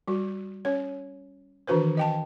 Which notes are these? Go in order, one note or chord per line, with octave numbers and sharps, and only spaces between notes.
G3 F#4
C#4 C#5
D#3 E3 D4 F#4 B4 C5
D#5 G5 A5